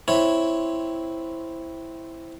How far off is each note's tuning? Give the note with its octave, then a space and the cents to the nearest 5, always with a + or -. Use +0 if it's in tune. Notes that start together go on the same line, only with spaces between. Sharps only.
C4 -5 E4 +0 C#5 -5